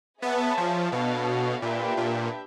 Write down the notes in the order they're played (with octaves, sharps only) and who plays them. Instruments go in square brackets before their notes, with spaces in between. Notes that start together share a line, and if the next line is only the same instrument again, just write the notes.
[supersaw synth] B3 [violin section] G#4 C#5 E5 A5
[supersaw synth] F3
[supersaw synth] B2 [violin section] D4 F#4 A4 C#5 F5
[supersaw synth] A#2 [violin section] D4 G4 B4 E5 G5
[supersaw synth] A#2